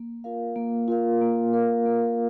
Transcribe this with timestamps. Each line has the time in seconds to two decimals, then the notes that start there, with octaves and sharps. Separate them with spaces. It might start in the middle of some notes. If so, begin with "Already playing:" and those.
Already playing: A#3
0.24 F4 A#4 F5
0.56 A#3
0.88 F4 A#4 F5
1.21 A#3
1.53 F4 A#4 F5
1.86 A#3